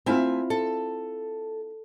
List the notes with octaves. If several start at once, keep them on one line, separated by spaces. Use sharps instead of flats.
A3 C4 E4 F4 E5 G#5
A4